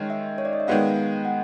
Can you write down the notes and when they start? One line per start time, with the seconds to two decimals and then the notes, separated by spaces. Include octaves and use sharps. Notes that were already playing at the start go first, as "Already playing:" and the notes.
Already playing: D#3 G#3 C#4
0.10 E5
0.38 C#5
0.45 D5
0.53 D#5
0.60 E5
0.67 D#3 G#3 B3 F5
1.25 F#5